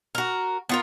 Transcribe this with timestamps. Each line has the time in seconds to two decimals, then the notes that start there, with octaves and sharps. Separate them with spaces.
0.15 F#4 A#4
0.69 B3 F4 A#4